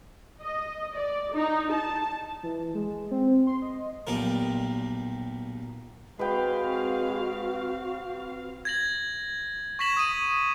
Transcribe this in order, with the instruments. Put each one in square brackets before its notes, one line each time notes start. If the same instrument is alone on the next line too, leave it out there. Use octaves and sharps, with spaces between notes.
[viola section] D#5
D5
D#4
A5
[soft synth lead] E3
G#3
C4
C6
D#5
[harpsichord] B1 A#2 G3 A#4
[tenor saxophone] G#3 [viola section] C4 F5 [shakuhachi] F#4 [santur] B4 G5
[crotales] G#6 A#6 F#7
C#6 G#6 A#6 B6 E7 F#7
D#6 D#7